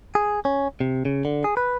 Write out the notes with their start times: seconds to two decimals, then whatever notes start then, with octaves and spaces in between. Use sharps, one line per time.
0.15 G#4
0.45 C#4
0.81 C3
1.05 C#3
1.25 D3
1.44 G#4
1.57 B4